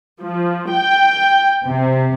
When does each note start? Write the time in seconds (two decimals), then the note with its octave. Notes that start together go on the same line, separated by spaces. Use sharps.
0.23 F3
0.73 G5
1.67 C3